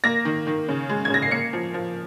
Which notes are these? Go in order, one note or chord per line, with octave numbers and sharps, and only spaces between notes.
A#3 A#6
D#3
D#3
C#3
G#3
G#6
C#3 A#6
C7
A#3 C#7
F3
F3